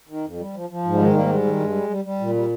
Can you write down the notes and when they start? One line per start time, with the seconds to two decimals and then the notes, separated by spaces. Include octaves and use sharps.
0.09 D#3
0.25 F2
0.39 G3
0.54 F3
0.70 F3
0.84 G#2
0.94 G3
0.99 D#3 G#3
1.14 G#2 G3 A#3
1.29 G3 G#3
1.45 D#3
1.60 G2
1.75 G3
1.89 G3
2.05 G3
2.20 A#2
2.35 G3